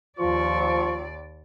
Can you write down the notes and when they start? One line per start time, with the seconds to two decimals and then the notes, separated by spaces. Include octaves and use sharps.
0.19 D#2 F3 F4 D5 C#6